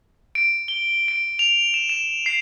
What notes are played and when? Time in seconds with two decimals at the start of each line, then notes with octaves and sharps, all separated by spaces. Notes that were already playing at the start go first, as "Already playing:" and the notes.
0.35 D7
0.68 G7
1.08 D7
1.39 F7
1.74 E7
1.89 E7
2.26 C7